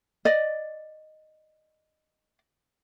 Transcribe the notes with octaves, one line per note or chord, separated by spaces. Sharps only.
D5 D#5